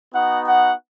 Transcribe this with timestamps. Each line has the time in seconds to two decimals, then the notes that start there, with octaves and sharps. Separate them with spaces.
0.14 B3 D#4 F#4 F#5
0.45 F#5